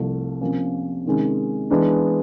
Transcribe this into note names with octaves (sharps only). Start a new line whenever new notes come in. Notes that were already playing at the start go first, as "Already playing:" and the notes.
Already playing: C2 C3 F3 A3
C3 F3 A#3 C#4
C3 D#3 G#3 C#4
E3 G#3 B3 D4